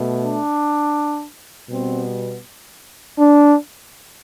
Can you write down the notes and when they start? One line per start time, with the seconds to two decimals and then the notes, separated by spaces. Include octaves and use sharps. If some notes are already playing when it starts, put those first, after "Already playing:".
Already playing: B2 A3
0.20 D4
1.69 B2 G3 B3 C4
3.18 D4